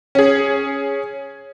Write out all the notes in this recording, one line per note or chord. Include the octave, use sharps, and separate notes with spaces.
C#4 G#4